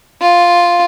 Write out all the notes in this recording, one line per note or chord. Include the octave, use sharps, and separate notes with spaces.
F4